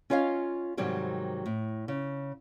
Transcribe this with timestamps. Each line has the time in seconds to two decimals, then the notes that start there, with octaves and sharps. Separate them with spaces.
0.10 C#4 F4 C#5 D#5 F5
0.77 G#2 C3 D#3 F#3 G3 C4
1.46 A2
1.88 C#3